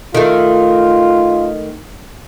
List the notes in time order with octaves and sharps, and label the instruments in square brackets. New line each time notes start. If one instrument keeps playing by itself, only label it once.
[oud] D#3 A3 [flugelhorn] F4